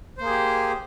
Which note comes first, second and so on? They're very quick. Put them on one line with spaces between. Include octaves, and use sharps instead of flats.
C5 A#3 G#4 G4